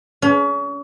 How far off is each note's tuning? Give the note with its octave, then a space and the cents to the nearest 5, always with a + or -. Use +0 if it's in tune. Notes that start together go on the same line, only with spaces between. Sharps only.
C#4 +35